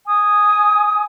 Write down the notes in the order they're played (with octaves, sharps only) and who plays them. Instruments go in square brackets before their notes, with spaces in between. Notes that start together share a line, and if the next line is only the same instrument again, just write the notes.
[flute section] G#5 D#6